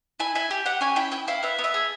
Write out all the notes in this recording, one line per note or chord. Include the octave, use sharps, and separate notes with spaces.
E4 G#5
E4 G#5
G4
G4 F#5
C#4 G#5
E4 G5
E4 G5
E4 F5
B3 E5
B3
E5
G#4